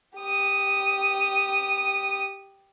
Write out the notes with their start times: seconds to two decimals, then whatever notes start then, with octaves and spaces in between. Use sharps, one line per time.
0.18 G4 D#6